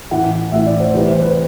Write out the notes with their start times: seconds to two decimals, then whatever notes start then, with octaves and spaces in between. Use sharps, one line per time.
0.11 A1 A2 E3 F#5
0.52 A1 A2 E3 E5
0.67 D5
0.80 C5
0.94 C2 C3 E3 B4
1.08 C5
1.22 B4